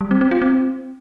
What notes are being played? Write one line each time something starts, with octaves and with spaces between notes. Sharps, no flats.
G3
C4
C4
F4
C4